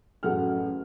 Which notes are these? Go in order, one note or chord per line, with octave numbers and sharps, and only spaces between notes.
A1 F#2 G#4 A4 F#5 F6